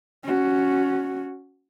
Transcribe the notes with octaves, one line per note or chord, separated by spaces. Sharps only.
C#4 F#4